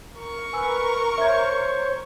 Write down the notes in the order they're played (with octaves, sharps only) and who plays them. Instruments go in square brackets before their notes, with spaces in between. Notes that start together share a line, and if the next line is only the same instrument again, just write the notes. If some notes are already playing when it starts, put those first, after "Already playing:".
[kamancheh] A#4 C#6
[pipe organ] B4 [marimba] G#5 E6
[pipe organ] C5 C#5 [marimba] E5 G#6